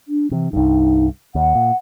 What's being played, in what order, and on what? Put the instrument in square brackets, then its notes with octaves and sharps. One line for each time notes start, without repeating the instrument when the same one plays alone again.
[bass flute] D4
[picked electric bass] C3 [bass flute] E3
[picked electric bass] C2 G2 [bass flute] D#4
[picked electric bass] D#2 [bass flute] F#5
[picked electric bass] A#2